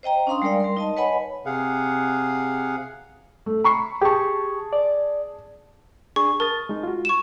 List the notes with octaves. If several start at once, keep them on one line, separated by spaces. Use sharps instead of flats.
C5 D#5 G5 A#5
C#4 D4 F5 C6 D#6
G3 G#3 A#4 D5 F5
G3 A#4 C6
D#4 D#5 A5
B4 C#5 D#5 F#5 G#5 B5
C3 G#4 F5 F#5
A3
B5 C#6 C7
G4 G#4 A5 C#6
D5
D4 G#4 C#6
A#4 A5 D#6 A6
G#3 D#4
F4 F#4
C#6 E7